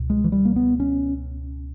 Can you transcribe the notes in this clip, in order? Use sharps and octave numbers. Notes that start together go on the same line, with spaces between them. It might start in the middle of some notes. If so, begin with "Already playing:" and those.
Already playing: C#2 B2
G#3
E3
G3
A#3
B3
C#4